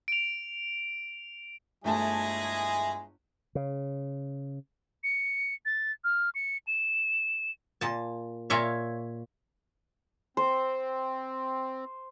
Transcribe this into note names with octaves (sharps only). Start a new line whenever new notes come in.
D7 F7
G1 G#3 A3 E4 G#4 A5
C#3
C#7
A6
F6
C#7
E7
A#2 A5
A#2 C#5 E5 F5
C4 C5